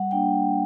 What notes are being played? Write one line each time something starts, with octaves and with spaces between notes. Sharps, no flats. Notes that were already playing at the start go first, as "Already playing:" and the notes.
Already playing: G3 F#5
A#3 D4 G5